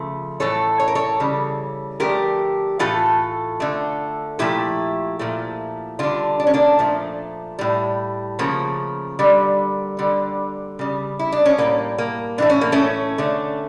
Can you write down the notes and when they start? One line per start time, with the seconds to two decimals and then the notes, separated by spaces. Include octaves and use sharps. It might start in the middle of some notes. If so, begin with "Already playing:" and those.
Already playing: C#3 F3 A3
0.40 A2 E3 A3 A4 C#5
0.80 C#5
0.88 A#4
0.95 A4 C#5
1.20 C#3 E3 G3
2.00 D3 F3 A3 G4 A#4
2.79 A2 E3 A3 F4 A4
3.60 D3 A3
4.39 A#2 F3 A3 E4 G4
5.19 A#2 F3 A3
5.99 D3 G3 D4 F4
6.40 D4
6.47 C#4
6.54 A#3 D4
6.79 A#2 F3 A3
7.59 A2 G3
8.39 C#3 F3 A3 A#3
9.19 D3 G3
9.99 D3 G3
10.79 C#3 G3
11.19 E4
11.32 D4
11.45 C#4
11.58 A2 G3 A#3
11.98 A#3
12.38 A2 E3 A3 D4
12.50 C#4
12.61 A#3
12.72 A3 C#4
13.18 D3 A3